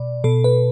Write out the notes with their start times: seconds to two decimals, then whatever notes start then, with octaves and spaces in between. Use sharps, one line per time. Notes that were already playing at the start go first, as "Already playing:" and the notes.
Already playing: B2 D5
0.24 B2 A4
0.44 B4